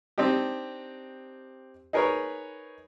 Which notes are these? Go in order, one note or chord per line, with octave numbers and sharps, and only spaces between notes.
C4 D4 D#4 G4
D#4 G#4 A#4 B4 C#5